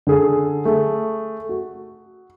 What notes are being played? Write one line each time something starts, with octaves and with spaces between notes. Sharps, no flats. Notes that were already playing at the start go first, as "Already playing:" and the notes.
D3 G#4 A4
A3 G#4
F#4